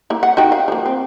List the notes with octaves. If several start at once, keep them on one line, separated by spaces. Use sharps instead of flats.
A#3 E4
F#5
D#4 F#4 G5
F5
F3 A#3
C4